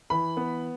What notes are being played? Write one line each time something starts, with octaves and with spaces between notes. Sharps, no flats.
E3 B5
B3